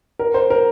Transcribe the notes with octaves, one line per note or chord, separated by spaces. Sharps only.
A#4
C5
A#4